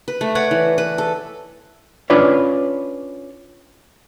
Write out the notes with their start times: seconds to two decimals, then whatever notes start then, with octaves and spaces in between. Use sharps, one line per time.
0.08 B4
0.21 A3
0.35 B4 C#5 D5 F#5
0.51 E3
0.78 B4
0.98 A4
2.10 C#4 D4 F4 B4 C#5 D5